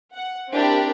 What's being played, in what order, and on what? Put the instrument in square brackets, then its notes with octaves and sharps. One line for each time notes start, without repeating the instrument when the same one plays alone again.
[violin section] F#5
C4 D4 E4 G4 A#4 D5